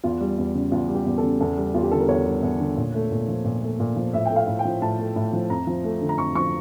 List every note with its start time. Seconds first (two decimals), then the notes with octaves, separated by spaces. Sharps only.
0.04 E2 F4
0.21 G3
0.38 E2
0.55 C#3
0.72 E2 F4
0.88 G3
0.95 G4
1.06 E2
1.18 A4
1.23 C#3
1.40 E2 A4
1.57 G3
1.74 E2 F4
1.83 G4
1.91 D3 A4
2.00 A#4
2.08 E2 C#5
2.26 G3
2.43 E2
2.60 D3
2.77 A#2
2.94 A3
3.11 A#2
3.28 F3
3.45 A#2
3.62 A3
3.80 A#2
3.96 F3
4.13 A2 E5
4.25 G5
4.31 A3
4.36 F5
4.47 A2
4.59 G5
4.65 F3
4.82 A2 A5
4.99 A3
5.16 A2
5.33 F3
5.50 F2 A#5
5.67 F3
5.84 A3
6.01 D3
6.09 A#5
6.18 F2 C#6
6.35 F3 C#6